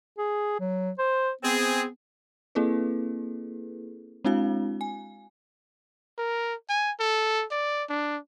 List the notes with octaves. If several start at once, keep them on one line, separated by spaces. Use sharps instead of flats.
G#4
F#3
C5
B3 C4 G#4
A#3 C4 E4 G#4 A4 B4
G#3 C4 D4 E4 F#4 F5
G#5
A#4
G#5
A4
D5
D4